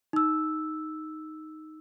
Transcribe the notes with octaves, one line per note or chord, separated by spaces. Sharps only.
D#4 E6